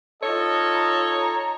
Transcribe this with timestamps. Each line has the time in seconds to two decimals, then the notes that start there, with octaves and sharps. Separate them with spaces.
0.23 D#4 F4 A4 C#5 D#5
0.74 A#5